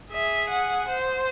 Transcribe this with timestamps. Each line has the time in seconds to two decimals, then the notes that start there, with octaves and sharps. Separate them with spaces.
0.11 G#4 E5
0.49 F#5
0.88 C5